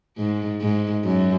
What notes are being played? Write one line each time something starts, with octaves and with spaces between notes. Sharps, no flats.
G#2
G#2
F#2